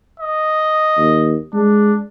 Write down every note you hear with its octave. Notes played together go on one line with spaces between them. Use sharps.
D#5
D#2
G#3 D4